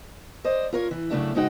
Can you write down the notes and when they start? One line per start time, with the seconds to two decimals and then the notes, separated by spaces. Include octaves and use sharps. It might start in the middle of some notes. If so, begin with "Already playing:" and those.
0.44 C5 D5 D#5
0.73 F4 A#4 C#5
0.91 E3
1.10 F#2 C#3 A3 D4 E4
1.35 G#2 C#3 G#3 D#4 F#4 G5